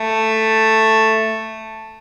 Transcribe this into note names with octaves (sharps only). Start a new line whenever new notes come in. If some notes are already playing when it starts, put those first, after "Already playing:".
Already playing: A3